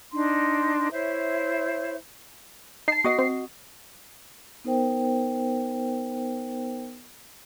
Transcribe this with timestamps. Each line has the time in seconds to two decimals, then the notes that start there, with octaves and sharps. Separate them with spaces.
0.12 D4 D#4 C6
0.92 E4 C5 C#5 E5
2.88 D#4 A5 C7
3.04 B3 F#4 D#5
3.19 C4
4.64 B3 D#4 A#4 C5 G5